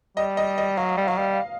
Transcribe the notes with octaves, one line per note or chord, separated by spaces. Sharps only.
G3 D#5
D#5
D#5
F#3 F5
G3
F#3 F5
G3